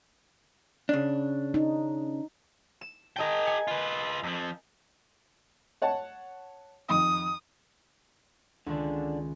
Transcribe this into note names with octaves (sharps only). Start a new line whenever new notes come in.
C#3 D4
D#4
E7
G#4 A#4 D#5 G5 A5
G#5 C#7
F4 B4
F2 F3
C#5 F#5 A5
F2 D#3 D#6
C#2 D3 D#3 D4